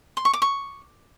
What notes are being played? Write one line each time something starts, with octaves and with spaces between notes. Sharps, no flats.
C6
C#6
D6
C#6